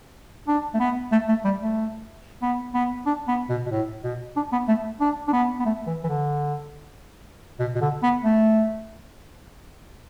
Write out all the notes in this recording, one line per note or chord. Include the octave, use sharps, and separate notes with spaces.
D4
A3
B3
A3
A3
G3
A3
B3
B3
D4
B3
B2
B2
A2
B2
D4
B3
A3
D4
D4
B3
B3
A3
E3
E3
D3
B2
B2
D3
B3
A3